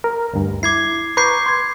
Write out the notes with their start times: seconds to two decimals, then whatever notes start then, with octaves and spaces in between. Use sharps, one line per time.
0.04 A#4
0.33 D2 G2
0.63 E4 D6 G#6 C7
1.17 B4 A#5 C#6 D6 G6 C7
1.46 C6 G#6